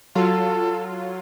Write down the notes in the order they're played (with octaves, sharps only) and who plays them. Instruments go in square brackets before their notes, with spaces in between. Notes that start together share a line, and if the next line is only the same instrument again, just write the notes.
[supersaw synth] F#3 F4 [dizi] A4